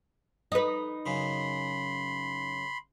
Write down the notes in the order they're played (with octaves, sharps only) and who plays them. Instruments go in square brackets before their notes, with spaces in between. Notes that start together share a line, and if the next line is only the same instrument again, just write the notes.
[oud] D#4 B4
[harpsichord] F#2 C#3 [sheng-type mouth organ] B5 C6